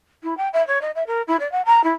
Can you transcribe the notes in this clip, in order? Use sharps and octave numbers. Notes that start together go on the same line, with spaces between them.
E4
G5
E5
C#5
D#5
E5
A#4
E4
D5
F#5
A#5
E4